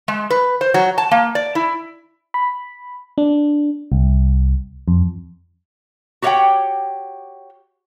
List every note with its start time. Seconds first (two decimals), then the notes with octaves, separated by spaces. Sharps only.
0.08 G#3
0.30 B4
0.61 C5
0.74 F#3
0.98 A5
1.11 A#3
1.35 D5
1.55 E4
2.34 B5
3.18 D4
3.92 C2
4.88 F2
6.22 F#4 G4 C#5 D#5 F#5 G5